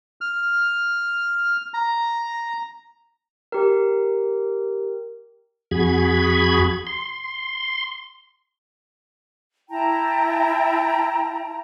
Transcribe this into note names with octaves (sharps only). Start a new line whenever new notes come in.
F6
A#5
G4 A#4
F2 F#4 G#4 B5 G#6
C6
E4 G5 A5 A#5